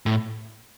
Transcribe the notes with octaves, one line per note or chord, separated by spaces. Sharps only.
A2